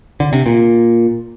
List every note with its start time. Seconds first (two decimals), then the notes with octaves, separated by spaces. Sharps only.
0.20 D3
0.33 C3
0.46 A#2